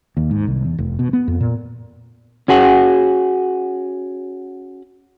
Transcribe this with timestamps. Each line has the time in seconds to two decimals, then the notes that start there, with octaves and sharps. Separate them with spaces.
0.17 D#2
0.31 G#2
0.47 C2
0.65 E2
0.79 F1
0.99 B2
1.13 B3
1.28 F2
1.40 A#2
2.48 C#4 F#4 G#4 F#5